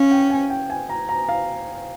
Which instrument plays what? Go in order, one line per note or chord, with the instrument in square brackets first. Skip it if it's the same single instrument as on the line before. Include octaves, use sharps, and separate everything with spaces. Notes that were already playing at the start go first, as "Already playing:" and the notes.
Already playing: [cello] C#4 [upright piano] F5
[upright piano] G5
G#5
G5
G#5
A#5
A#5
F5